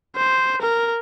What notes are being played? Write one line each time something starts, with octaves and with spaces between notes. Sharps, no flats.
C5
A#4